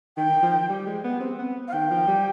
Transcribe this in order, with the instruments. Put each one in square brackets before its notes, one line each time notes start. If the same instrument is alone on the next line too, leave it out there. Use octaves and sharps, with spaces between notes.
[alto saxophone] D#3 [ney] G5
[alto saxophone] D#3
F3
G3
G#3
B3
C4
B3
[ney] F5
[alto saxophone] D#3 [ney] G5
[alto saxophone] F3
G3